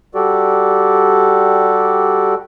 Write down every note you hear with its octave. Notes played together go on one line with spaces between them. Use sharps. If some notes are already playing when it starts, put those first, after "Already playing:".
G3 F#4 G4 A4 D5